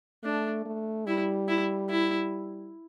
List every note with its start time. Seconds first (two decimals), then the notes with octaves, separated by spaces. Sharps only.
0.23 A3 D4
0.66 A3
1.06 G3 E4
1.48 E4
1.90 E4